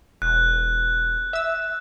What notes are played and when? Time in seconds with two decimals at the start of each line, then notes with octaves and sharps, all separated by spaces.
0.22 E1 F#6
1.33 E5 E6